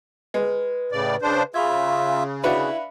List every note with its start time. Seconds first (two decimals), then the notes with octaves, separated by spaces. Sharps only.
0.34 G#3 B4
0.92 A2 C#3 D5
1.22 C#3 D4 C5
1.54 C#3 F4 E5 B5 C#6 G#6
2.43 D4 E4 F#4 B4 E5 F5 B5